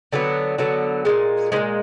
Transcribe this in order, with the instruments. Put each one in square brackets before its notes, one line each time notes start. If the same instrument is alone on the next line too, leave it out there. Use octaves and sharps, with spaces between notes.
[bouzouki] D3 F#3 B3
D3 F#3 B3
A#2 F3 G#3
F3 G#3
A#2